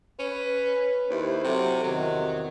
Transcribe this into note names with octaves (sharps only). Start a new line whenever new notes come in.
C#4 B4
D#2 E4 G4 C5
C3 F#3 A4
E2 C3 D#3 F#3